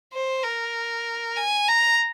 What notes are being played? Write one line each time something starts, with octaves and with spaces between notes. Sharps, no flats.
C5
A#4
G#5
A#5